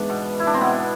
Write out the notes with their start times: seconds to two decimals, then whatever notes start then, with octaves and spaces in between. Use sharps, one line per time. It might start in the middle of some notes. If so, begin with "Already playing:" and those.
Already playing: G#2 E3 B3 D4
0.09 B2
0.40 E4
0.47 D4
0.54 C4
0.61 B2 B3